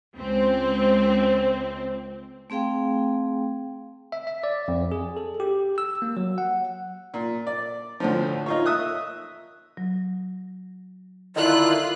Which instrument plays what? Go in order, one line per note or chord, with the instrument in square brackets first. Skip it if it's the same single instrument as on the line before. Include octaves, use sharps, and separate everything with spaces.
[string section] C#2 C4
[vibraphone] A3 C4 G#4 F5 G5
[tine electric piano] E5
E5
D5
F2
G#4
A4
G4
E6
A#3
F#3
F#5
[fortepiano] A#2
D5
D2 A2 F3
D#4 F4 C#5
E5 D#6 F#6
[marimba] F#3
[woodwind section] D3 D#3 [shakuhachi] E4 [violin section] F4 F#6